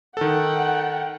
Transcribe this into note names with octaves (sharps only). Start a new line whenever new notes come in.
D#3 A4 F#5 G5